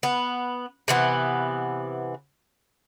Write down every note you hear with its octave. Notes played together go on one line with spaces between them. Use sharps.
B3
C3 E3 B3